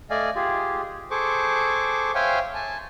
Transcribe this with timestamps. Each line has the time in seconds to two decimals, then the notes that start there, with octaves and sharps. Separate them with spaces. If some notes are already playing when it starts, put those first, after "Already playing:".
0.10 A3 D5 D#5 F5 G#5
0.36 F4 G4 G#4
1.11 G#4 A4 C5 C#6 D6
2.15 C5 C#5 E5 F5 G5 G#5
2.55 G#5 A5